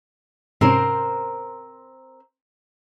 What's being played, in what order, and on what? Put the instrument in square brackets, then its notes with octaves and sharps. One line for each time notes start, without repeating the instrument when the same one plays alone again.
[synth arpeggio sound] G#2 C3 C#4 [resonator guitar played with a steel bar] C4 A#4 C5